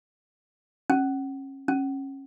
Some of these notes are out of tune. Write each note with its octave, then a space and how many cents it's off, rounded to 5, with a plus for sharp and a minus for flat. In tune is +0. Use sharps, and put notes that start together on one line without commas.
C#4 -30
C#4 -25